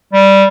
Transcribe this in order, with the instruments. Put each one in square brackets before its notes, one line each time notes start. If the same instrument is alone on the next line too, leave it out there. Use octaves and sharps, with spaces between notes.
[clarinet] G3